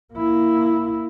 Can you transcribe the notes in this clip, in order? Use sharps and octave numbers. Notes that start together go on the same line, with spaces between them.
A#3 E4